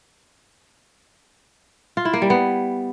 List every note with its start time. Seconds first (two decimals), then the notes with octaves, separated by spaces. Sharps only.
1.97 F4
2.05 E4
2.13 A#3
2.22 G3
2.30 B3